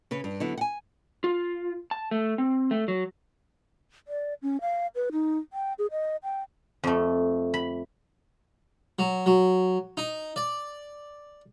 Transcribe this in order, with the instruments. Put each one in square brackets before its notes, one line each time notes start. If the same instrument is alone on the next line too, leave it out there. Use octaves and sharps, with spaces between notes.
[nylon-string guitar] C#3 C#4 B4
G2
D3 F#3 B3 E4
F#5 G#5
[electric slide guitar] F4
A5
A3
C4
A3
F#3
[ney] D5
C#4
F5
B4
D#4
G5
G#4
D#5
G5
[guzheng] F2 A3
B5
[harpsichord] F#3
F#3
D#4
D5